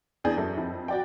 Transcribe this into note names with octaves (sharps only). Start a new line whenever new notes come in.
E2 D4 G#4 G6
F#2 A4
F2
F#4 D5 G5